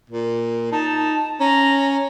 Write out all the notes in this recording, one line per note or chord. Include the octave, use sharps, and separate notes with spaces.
A#2
D#4 A5
C#4 A#5